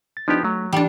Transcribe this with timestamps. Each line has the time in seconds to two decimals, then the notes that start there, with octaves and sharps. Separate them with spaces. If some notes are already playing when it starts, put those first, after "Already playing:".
0.17 A6
0.28 F3 B3 D4 D#4 G4
0.44 F#3 A3
0.73 E3 G3 D4